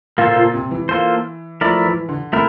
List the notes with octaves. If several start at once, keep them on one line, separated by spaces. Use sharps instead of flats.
A#2 A#3 F4 A4 C5
A#2
C3
E3
A#3 F4 A4 C5
F3 A3 E4 A#4 D5
E3
D3
C3 A3 E4 A#4